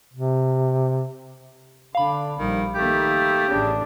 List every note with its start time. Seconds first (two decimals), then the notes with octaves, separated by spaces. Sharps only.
0.13 C3
1.95 D3 D4 F5 B5
2.39 A#1 D#3 G3
2.75 D#3 A3 A#3 G4
3.49 A1 C#3 D4